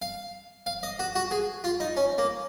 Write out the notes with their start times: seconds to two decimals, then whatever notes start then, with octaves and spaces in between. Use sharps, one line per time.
0.02 F5
0.66 F5
0.83 D#5
0.99 F#4
1.15 F#4
1.31 G#4
1.64 F4
1.80 D#4
1.97 C#4
2.18 A#3